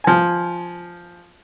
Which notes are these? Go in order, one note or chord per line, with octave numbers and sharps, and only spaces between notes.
F3 G#5